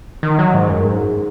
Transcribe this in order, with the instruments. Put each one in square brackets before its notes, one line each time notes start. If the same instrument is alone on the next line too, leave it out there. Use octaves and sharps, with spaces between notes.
[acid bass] D#3
F#3
G#2
F#2
G#2